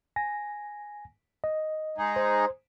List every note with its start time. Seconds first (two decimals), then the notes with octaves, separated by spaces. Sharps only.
0.16 G#5 A#6
1.44 D#5
1.98 G#3 D#4 G#4
2.16 C5